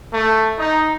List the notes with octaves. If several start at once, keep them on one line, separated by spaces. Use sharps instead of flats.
A3
D#4